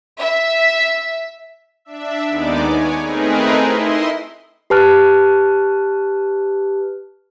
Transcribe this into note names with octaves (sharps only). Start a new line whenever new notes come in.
E5
D4 E5
D#2 G#3 B3 D#4 D5 D6
C#5 G#5
A3 C4 D#4 G#4 A#4 B4
E4 D#5 C6
G4 B4 A5 F6 F#6